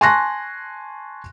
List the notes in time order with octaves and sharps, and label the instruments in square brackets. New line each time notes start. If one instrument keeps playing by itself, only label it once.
[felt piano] G#5 A5 C6 C#6 F#6 A#6